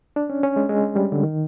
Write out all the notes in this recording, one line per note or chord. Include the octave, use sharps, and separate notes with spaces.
D4
C#4
C#4
G#3
G#3
G3
D3
D#3